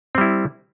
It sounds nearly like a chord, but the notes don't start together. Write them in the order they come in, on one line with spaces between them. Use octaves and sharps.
C4 G3 E4